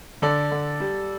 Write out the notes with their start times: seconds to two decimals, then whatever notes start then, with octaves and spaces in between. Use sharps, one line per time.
0.22 D3 A4 D5
0.51 D3
0.80 G3